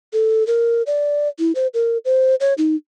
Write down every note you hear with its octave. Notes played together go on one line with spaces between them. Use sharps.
A4
A#4
D5
E4
C5
A#4
C5
C#5
D#4